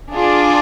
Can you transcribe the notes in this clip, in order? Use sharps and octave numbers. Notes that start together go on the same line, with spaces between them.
D4 F4 G#4